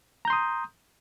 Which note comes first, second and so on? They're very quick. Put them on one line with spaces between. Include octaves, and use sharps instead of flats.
A#5 G6 C6 D#6